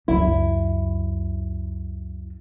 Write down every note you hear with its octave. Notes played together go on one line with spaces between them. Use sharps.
C#2 F#2 E4